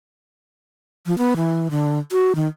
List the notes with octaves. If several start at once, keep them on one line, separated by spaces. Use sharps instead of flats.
F3
B3
E3
D3
F#4
D#3